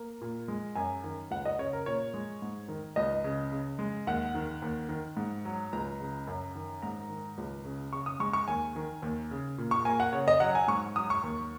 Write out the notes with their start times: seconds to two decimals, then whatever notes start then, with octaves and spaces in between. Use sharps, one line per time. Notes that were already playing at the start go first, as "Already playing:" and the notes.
Already playing: A#3
0.21 A#2
0.48 G#3
0.75 F#2 G#5
1.04 D#3
1.31 C#2 F#5
1.45 D#5
1.58 C#3 C#5
1.73 A#4
1.86 A#2 C#5
2.14 G#3
2.42 G#2
2.68 D#3
2.96 C#2 D#5
3.24 C#3
3.52 C#3
3.79 G#3
4.07 D#2 F#5
4.35 D#3
4.62 D#2
4.89 D#3
5.17 G#2
5.45 F#3
5.73 C#2 A#5
6.00 C#3
6.27 F#2
6.55 D#3
6.82 G#2 A#5
7.10 D#3
7.38 C#2
7.65 C#3
7.93 C#3 C#6
8.06 D#6
8.20 G#3 C#6
8.33 C#6
8.48 D#2 G#5
8.76 D#3
9.02 D#2
9.31 C#3
9.58 A#2
9.71 C#6
9.85 A#3 G#5
10.00 F#5
10.13 C#3 C#5
10.28 D#5
10.40 F#3 F#5
10.55 G#5
10.68 G#2 C#6
10.96 F#3 D#6
11.10 C#6
11.23 D#2